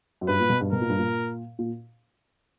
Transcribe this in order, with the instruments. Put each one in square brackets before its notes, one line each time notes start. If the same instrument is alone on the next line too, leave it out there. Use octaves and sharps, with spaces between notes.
[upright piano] F#2
[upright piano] G2 [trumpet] B4
[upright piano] A#2
B2
G2
[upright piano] B2 [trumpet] A#4
[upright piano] A#2
G2
A#2
A#2